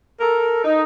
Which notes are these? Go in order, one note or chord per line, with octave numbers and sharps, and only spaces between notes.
A4 A#4
D#4